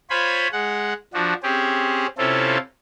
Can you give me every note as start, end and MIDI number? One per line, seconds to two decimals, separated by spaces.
0.10 0.48 65
0.10 0.48 72
0.10 0.48 73
0.10 0.48 80
0.10 0.48 83
0.52 0.93 56
0.52 0.93 78
1.14 1.33 53
1.14 1.33 62
1.14 1.33 66
1.43 2.06 60
1.43 2.06 61
1.43 2.06 67
1.43 2.06 68
2.18 2.57 48
2.18 2.57 60
2.18 2.57 61
2.18 2.57 64
2.18 2.57 65
2.18 2.57 69